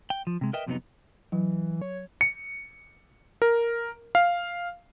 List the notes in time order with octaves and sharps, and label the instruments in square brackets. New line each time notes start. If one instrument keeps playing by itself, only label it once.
[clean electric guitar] G5
F3
C3 G#3
A#4 B4 D#5 E5 G5
F2 C3 F#3 G3 B3 D#4
[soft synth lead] E3 [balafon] F#3
[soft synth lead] C#5
[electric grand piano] C#7
A#4
F5